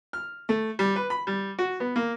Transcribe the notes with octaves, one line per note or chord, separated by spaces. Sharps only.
F6
A3
G3
B4
B5
G3
F#4
B3
A#3